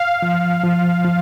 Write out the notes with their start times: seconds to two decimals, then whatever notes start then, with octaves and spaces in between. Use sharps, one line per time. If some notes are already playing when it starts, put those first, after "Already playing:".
Already playing: F5
0.22 F3
0.64 F3
1.05 F3